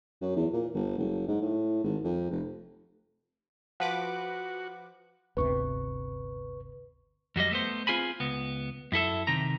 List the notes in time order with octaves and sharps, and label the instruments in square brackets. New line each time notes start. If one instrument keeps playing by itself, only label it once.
[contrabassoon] F#2
E2
A#2
G1
F#1
G#2
A2
G#1
F2
F1
[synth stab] F3 B4 D6 [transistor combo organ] F#4 [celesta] F#5
[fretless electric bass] G1 D2 C3 [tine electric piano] B4 C#6
[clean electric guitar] F2 F#3 G3 D#5
A3 B3 C5
C4 F4 G#4 G#5 B5
C#2 B3
F#2 E4 A4 E5
C3 D#3 A#5